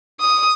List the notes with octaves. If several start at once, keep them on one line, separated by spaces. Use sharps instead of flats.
D#6